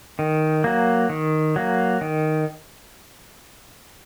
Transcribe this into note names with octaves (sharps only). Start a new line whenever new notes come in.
D#3
F#3 A#3
D#3
F#3 A#3
D#3